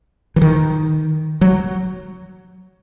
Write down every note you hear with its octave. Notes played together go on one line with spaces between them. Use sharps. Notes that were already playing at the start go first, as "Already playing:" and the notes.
E3
D#3
F#3